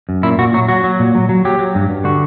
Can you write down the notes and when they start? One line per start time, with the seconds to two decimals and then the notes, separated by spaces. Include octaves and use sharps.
0.09 F#2
0.23 A#2 E4
0.38 A#2 F#4
0.54 F#3 F#4
0.68 F#3 F#4
0.84 F#3
0.99 A#2
1.15 F#3
1.29 F#3
1.45 F#3 G4
1.59 F#3
1.75 G2
1.89 G2
2.04 D3 F#4